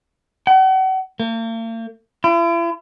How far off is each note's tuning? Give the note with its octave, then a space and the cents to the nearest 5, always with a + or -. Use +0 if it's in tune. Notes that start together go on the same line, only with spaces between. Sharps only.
F#5 +40
A#3 -45
E4 +45